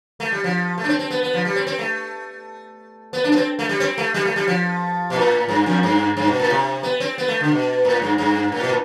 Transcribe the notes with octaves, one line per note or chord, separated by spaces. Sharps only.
A3
G3
F3
A3
D4
C4
C4
B3
B3
F3
G3
C4
C4
A3
B3
D4
B3
C4
A3
G3
C4
A3
G3
A3
G3
F3
B2
A2
G2
F2
G2
G2
B2
A2
C3
B3
C4
B3
A3
D3
B2
A2
G2
G2
A2
B2
A2